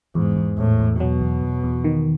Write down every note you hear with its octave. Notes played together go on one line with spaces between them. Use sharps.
E2 G#2
E2
E2 A2
E2
B2 F#3
E2
E2
E2
D#3